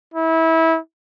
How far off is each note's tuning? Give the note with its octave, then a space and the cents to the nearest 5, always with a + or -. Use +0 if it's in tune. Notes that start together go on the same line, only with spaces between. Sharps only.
E4 -25